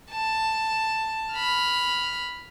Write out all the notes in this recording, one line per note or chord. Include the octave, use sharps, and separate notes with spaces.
A5
B5 F6